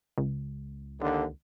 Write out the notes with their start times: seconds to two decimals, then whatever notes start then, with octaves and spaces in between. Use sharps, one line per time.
0.18 C#2
1.00 D#2 D3